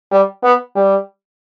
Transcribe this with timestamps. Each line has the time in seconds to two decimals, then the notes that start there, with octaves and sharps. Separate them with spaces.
0.12 G3
0.44 B3
0.76 G3